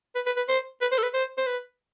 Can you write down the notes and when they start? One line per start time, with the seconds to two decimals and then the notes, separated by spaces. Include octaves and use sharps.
0.15 B4
0.26 B4
0.37 B4
0.48 C5
0.82 B4
0.92 C5
0.98 A4
1.03 B4
1.14 C5
1.38 C5
1.47 B4